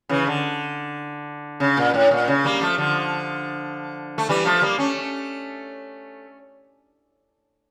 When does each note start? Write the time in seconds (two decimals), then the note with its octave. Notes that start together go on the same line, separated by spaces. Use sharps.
0.09 C#3 E3
0.27 D3
1.60 C#3
1.77 A#2
1.94 A2
2.11 A#2
2.28 C#3
2.44 G3 A#3
2.61 F3 A3
2.78 D3 F3
4.18 A3
4.29 E3 G3
4.45 F3 A3
4.62 G3 A#3
4.78 A3 C#4